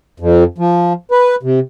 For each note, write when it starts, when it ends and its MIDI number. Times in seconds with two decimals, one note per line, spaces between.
0.20 0.44 41
0.58 0.93 53
1.11 1.35 71
1.43 1.59 48